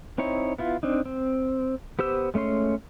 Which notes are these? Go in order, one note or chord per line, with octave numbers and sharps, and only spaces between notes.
C4 D#4 E4 C#5
B3 E4 F4
C4 D4 D#4
C4
B3 G4 C5 E6
G#3 A3 C#4 C#5 C6